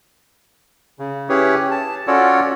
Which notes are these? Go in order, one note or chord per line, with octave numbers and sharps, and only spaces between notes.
C#3
C#4 E4 G4 G#4 B4 C#5
A5
C#4 F4 F#4 A4 C#5 D5